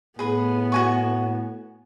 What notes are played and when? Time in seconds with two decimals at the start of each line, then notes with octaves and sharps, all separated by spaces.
0.19 A2 B3 G#4 B4
0.72 F#4 G#5 C#6